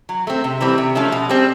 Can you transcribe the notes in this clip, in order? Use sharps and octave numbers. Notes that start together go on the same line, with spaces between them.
F#3
A3 C4
C3
E3 G3 C4
C3
F3 A3 C#4
B2
G3 C4